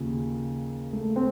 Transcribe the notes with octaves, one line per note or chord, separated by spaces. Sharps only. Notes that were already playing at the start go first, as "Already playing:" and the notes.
Already playing: D#2 C#3 F3
A3
C4